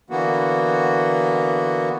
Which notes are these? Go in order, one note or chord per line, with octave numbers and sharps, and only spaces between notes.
D3 E3 A#3 B3 F#4